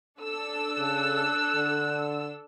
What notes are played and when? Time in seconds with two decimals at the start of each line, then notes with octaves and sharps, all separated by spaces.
0.20 D4 A4 E6
0.78 C#3 F#6
1.56 D3